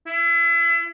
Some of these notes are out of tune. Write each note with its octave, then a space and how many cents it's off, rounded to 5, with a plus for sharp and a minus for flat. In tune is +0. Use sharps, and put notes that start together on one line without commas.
E4 +35